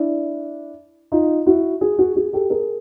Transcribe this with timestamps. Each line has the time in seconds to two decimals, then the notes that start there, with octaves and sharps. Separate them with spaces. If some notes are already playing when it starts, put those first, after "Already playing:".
Already playing: D4 E4
1.12 D#4 F4
1.46 E4 F#4
1.81 F#4 G#4
1.98 F#4 G#4
2.16 F#4 G#4
2.33 G4 A4
2.50 G#4 A#4